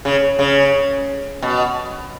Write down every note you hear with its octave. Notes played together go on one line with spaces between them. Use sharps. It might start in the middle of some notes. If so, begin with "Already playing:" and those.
C#3
C#3
B2